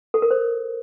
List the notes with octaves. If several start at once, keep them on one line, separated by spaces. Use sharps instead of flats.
A4
A#4
C5